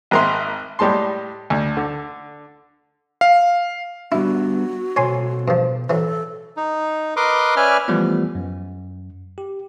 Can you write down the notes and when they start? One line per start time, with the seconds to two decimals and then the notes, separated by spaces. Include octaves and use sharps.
0.11 G#1 G#3 A#4 E5 C6
0.79 A2 G3 G#3 A5 C6
1.50 D2
1.77 D3
3.21 F5
4.12 G3 B3 D4 E4 F#4
4.96 B2 A4 C5 C#5 G#5 C6
5.48 G2 F3
5.90 E3 F#3 A4
6.57 D#4
7.17 A#4 B4 D#5 C6 D6
7.57 C#4 B4 D5 E5 G#5 F6
7.88 E3 F3 G3 A3 B3
8.35 F#2
9.38 G4